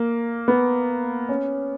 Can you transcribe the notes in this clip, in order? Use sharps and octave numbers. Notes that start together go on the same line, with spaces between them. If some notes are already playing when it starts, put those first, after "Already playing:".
Already playing: A#3
B3
C#4